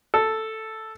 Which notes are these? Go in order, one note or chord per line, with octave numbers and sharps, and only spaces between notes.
A4